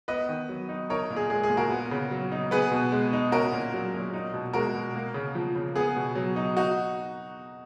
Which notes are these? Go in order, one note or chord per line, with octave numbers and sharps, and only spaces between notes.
B3 B4 D#5
D#3
F#3
D#4
D#4 A#4 C#5
A#2
G#4
G#3 G#4
G#4
A#2
F#4 A#4
B3
C#3
F#3
D#4
B3 G#4 B4
B2
G#3
D#4
C#4 F#4 A#4
A#2
F#3
A#2
D#4
B2
G#3 F#4 A#4
B2
A#3
C#3
F3
C#3
B3 G#4
B2
F#3
D#4
D#4 F#4